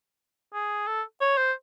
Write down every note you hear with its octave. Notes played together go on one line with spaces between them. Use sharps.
G#4
A4
C#5
C5